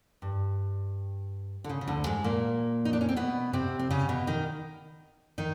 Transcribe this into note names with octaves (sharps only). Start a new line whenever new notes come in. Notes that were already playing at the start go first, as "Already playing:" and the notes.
G2
D3
C#3
C#3
D2 D3
G#2 G#3
A#2 A#3
D#4
D4
C#4
C4
B2 B3
C3 C4
C4
C#3 C#4
B2 B3
D#3 D#4
D#3 D#4